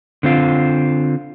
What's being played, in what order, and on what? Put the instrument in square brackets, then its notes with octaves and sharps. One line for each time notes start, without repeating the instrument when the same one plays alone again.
[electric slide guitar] D3 C4 F4